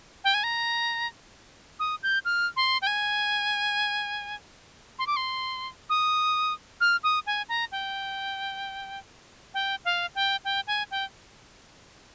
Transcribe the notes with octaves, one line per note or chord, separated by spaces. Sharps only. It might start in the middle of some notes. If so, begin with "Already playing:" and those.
G5
G#5
A#5
D#6
G6
F6
C6
G5
G#5
C6
D6
C6
D#6
F6
D#6
G#5
A#5
G5
G5
F5
G5
G5
G#5
G5